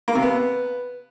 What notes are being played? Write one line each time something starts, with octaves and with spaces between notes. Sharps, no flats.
A#3
C3
B3